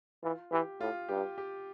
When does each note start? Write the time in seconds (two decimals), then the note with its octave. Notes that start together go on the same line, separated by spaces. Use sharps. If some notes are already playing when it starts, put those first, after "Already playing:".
0.23 E3 F4
0.52 E3 G4
0.81 A2 F4
1.09 G2 G4
1.38 G4